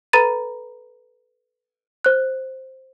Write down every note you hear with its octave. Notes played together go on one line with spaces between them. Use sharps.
A4 B4 A#5 B5 A6 D#7
C5 F#6